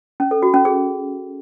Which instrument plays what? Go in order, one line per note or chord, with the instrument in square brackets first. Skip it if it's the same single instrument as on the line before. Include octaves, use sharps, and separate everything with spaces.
[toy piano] C#4
A4
F#4
C#4
G#4